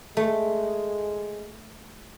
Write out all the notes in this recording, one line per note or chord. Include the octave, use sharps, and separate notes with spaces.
G#3 A3